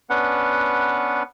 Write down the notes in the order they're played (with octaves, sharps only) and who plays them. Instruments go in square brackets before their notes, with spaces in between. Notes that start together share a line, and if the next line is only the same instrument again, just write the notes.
[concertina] B3 C#4 D4 B4 F#5